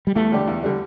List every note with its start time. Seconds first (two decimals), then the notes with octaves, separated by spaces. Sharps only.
0.07 G3
0.15 E2 A3
0.32 D3 G3 D4 G4
0.47 E2
0.62 D3 G3 D4 G4